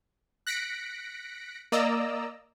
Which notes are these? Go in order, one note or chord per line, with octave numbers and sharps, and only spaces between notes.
F#6 A#6 B6 C#7 D7
A#3 D5 D#5 A#5 E6